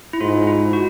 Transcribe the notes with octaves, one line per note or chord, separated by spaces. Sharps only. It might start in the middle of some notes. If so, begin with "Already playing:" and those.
E4
G#2 F4
E4
F#4